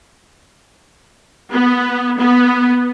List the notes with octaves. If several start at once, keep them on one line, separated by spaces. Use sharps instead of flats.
B3
B3